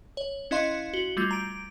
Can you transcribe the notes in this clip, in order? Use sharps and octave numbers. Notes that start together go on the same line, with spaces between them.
C#5
C#4 E4 D#5 F5 C6
F#4 G7
G3 A3 F4 G#6
A#5 D7